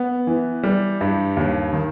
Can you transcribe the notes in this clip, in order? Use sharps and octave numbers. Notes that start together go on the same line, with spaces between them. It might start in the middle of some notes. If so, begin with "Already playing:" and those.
Already playing: B3
E3
G3
G2
D#2
D#3